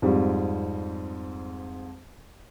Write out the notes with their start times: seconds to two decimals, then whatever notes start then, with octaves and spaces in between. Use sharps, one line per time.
0.02 F2 G#2 G3